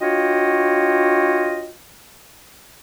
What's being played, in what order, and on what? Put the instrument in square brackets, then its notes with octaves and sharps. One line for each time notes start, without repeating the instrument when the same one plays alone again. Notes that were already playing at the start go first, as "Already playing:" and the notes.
[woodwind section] D4 F4 F#4 C#5 D#5 G5